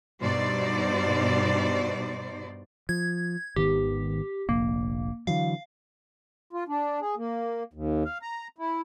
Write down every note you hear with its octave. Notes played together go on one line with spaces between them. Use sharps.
G2 B2 D#4 C5 D5
F3 G#6
G#1 D#3 B3 G4
F1 A#1 A#3
D3 E3 F#3 F5
F4
D4
G#4
A#3
D#2
F5
A#5
E4